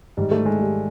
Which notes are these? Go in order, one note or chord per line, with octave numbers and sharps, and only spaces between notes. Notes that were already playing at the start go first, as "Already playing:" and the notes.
G#2 D#3 G3
A3
G#3
G3